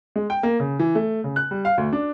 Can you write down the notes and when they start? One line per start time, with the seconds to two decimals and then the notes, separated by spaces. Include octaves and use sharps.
0.16 G#3
0.30 G5
0.43 A#3
0.60 C#3
0.79 E3
0.95 A3
1.24 C#3
1.36 F#6
1.51 G3
1.65 F5
1.78 D2
1.93 D4